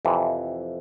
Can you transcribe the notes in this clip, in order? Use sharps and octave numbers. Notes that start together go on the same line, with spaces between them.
F2 C3 E3